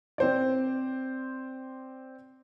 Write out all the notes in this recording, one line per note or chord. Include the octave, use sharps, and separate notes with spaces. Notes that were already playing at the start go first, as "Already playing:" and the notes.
C4 C5 D5